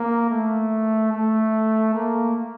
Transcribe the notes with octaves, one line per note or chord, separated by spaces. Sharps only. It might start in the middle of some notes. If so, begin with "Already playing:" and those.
Already playing: A#3
A3
A3
A#3